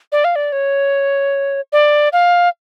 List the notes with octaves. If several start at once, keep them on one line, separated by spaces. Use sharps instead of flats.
D5
F5
D5
C#5
D5
F5